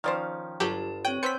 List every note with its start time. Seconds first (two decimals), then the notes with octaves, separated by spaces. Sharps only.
0.04 D#3 F3 C#4 C5 D5 F5
0.60 G1 F#3 F4 G4 A5
1.05 C4 C#5 G5
1.23 B3 C4 G#5 G6 B6 C#7